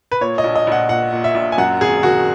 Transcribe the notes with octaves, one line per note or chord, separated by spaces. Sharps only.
B4
A#2 C#5
D#5
A#1
D#5
A#1 F#5
A#2 F#5
A#2
E5
A#1
G#5
F#2 F#5
G#1 G#4
D#3 F#4